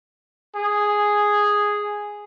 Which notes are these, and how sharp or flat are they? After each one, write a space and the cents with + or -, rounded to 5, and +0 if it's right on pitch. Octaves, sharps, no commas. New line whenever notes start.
G#4 -5